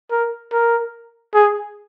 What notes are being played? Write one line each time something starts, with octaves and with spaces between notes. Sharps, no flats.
A#4
A#4
G#4